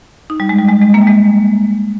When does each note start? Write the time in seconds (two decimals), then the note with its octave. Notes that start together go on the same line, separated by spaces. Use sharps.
0.30 D#4
0.40 G3
0.49 G#3
0.59 G3
0.69 G#3
0.81 G#3
0.94 A#3
1.02 G3
1.07 G#3